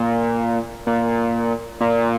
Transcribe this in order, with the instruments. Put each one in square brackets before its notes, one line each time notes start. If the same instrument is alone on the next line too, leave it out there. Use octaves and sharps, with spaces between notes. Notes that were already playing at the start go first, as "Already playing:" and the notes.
Already playing: [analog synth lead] A#2
A#2
A#2